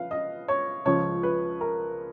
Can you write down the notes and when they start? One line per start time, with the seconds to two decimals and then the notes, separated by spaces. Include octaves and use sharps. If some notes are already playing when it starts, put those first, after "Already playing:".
Already playing: F3 B4 F5
0.11 D#5
0.48 C#5
0.85 C#2 C#3 F3 C#5
1.23 B4
1.61 A#4